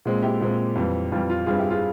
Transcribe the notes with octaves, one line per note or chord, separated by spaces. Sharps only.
A#2 G#3 C4
E4 G4
A#2 G#3 C4
F2 E3 G3
F2 E3 G3 F4
F4
G2 G3 C4 F4 G#4
E4 G4
F4 G#4